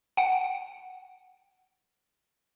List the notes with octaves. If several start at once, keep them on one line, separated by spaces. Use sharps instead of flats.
F#5 G5